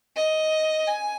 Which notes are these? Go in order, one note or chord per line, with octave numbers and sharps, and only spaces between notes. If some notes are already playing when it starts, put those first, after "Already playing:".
D#5
G#5